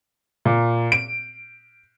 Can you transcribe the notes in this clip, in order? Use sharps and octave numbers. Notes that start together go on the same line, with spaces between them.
A#2
D7